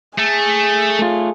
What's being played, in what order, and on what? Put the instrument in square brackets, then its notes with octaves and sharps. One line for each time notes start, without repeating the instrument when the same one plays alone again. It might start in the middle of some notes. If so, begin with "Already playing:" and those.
[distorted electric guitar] A3 [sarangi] G#4
[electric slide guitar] A3 F4